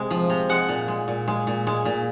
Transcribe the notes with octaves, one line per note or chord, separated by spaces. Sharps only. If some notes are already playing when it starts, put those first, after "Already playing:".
Already playing: C3 G#3
F3
C3
G#3 F#5
A#2
G#3
A#2
G#3
A#2
G#3
A#2